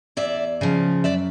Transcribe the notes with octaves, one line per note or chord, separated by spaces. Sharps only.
E2 D5 E5
C#3 F3
F#2 D5 E5